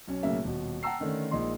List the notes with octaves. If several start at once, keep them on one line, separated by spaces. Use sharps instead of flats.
B1 C#4
B1 A2 C#3 A#3 E5
D#1 B2
F#5 G5 A5 A#5 E6 C7
D3 D#3 A3 C#4
A#1 G#3 A#3 D#4 C6